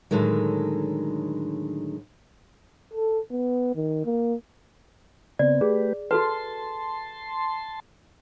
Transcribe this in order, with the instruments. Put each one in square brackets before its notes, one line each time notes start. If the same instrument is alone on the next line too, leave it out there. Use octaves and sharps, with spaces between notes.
[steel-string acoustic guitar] A2 D3 D#3 F#3 G#3
[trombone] A4
B3
D#3
A#3
[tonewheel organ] C#3 B3 C4 [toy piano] D5
[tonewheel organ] A3 G4 B4 [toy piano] G#4
[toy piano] F#4 A4 B4 [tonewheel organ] A5 C6